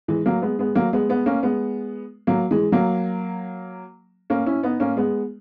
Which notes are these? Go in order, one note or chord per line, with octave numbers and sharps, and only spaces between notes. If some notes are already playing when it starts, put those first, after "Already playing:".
E3 G#3
F#3 A#3
G#3 B3
G#3 B3
F#3 A#3
G#3 B3
G#3 B3
A#3 C#4
G#3 B3
F#3 A#3
E3 G#3
F#3 A#3
A#3 C#4
C#4 E4
B3 D#4
A#3 C#4
G#3 B3